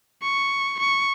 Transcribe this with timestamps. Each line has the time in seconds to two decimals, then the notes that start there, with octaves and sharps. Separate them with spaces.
0.22 C#6
0.79 C#6